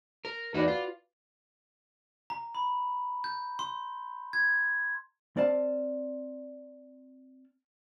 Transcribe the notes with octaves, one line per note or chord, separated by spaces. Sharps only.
A#4
E2 A#3 D#4 F#4 B4 D5
F4
A#5
B5
G6
C6
G#6
C4 D5 F5 A5